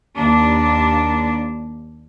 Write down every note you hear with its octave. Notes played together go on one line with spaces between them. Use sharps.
D#2 D4